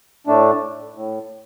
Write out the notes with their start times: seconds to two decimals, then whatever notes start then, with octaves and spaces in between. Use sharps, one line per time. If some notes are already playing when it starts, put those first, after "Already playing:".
0.27 A2 A3 D4
0.95 A2